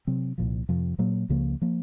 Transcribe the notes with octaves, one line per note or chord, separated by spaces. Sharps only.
C3 F#3 C4
C2 A#2 F3
F2 C3 F3
A#2 F#3 A#3
C#2 C#3 F3 A#3
F3 A#3